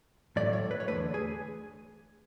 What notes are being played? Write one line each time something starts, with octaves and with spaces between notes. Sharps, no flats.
A2 F#3 A3 D5
C#5
B4
C#5
E2 D3 A3 B4
G#4